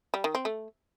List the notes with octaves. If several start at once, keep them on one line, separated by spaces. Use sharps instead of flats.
G3
D#3
C4
A3